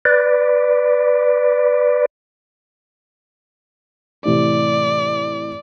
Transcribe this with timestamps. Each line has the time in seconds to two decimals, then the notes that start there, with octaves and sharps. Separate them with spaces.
0.05 B4 D5
4.25 A2 C3 E3 D5